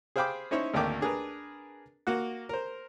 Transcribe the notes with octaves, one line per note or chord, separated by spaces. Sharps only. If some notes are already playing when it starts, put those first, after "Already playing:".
G#4 C5 F5 G5 B5 D6
C#4 D#4 E4 C5 C#5 C#6
G#1 D2 A3 A#3 G5 D6
D4 G#4 A#4 B4
A#3 F#4 F#5
A#4 C5